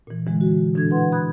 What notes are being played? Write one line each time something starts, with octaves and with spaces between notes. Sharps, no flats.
A#2 E3
D3 E3 G#3 E4
F#4
B2 E3 D4 A4 G#6
E4 B4 F#5 C6
B5 D#6 F#6 G#6